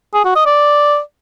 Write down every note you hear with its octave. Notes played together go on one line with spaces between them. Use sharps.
G#4
F#4
D#5
D5